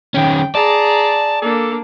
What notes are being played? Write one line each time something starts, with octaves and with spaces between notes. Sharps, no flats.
D#3 C#4 G5
G#4 D5 A5 A#5
A#3 D4 A4